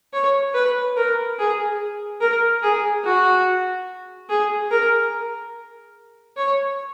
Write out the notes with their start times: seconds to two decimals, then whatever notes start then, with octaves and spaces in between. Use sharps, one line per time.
0.13 C#5
0.55 B4
0.97 A#4
1.39 G#4
2.21 A#4
2.63 G#4
3.04 F#4
4.29 G#4
4.71 A#4
6.37 C#5